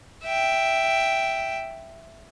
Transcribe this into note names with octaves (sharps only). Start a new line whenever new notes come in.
E5 G5